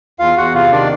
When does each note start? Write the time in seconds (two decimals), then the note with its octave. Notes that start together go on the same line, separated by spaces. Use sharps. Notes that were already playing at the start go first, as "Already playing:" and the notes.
0.19 E2 F4 F5
0.37 E2 F#4 F#5
0.54 C3 F4 F5
0.71 D#3 D4 D5